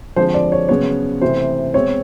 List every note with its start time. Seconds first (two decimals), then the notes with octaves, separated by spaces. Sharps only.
0.16 D3 F3 G#3 C4 C5
0.34 D5
0.52 C#5
0.69 C#3 F#3 B3 C#5
1.22 C3 E3 A3 C5
1.74 B2 G#3 C4 C#5